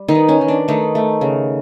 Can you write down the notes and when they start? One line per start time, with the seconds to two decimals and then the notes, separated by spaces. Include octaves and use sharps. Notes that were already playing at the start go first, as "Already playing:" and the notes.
Already playing: G3
0.08 D#3 D#4
0.15 B3
0.29 C#4
0.41 D#3
0.48 D4
0.68 D#3 A3 D#4
0.95 A3
1.21 C#3